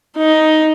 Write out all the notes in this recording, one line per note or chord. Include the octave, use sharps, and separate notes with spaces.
D#4